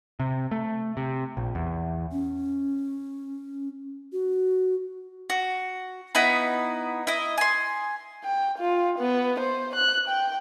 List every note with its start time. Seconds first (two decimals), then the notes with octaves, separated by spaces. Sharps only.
0.20 C3
0.51 A3
0.97 C3
1.37 A#1
1.55 E2
2.11 C#4
4.13 F#4
5.30 F#4
6.15 B3 D#4 E4 B5
7.07 E4 D#5
7.38 G#5 C6
8.24 G5
8.59 F4
8.99 B3
9.40 C5
9.76 F#6
10.08 G5